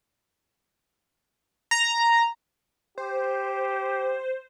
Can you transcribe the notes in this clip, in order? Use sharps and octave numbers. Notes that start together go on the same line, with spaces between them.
A#5
G4 C5